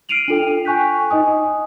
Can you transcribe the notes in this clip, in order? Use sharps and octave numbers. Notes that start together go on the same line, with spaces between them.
F6 C7 D7 D#7 F7 F#7
D4 F4 A4 G5
G5 G#5 C#6 F#6 G6 B6
D#4 D#5 G#5 D#6